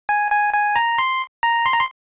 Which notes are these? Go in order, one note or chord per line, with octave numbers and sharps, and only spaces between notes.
G#5
G#5
G#5
A#5
C6
A#5
C6
A#5
C6